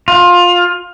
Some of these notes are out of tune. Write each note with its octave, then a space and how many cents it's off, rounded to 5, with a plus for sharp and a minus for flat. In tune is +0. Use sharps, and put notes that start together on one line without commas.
F4 +20